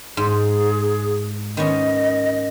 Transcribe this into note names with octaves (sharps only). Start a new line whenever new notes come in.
G#2 G#4
D#3 B3 C#4 D#5